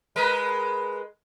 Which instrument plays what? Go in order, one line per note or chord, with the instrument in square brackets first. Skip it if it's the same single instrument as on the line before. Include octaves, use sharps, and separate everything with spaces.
[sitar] G#3 A#4 B4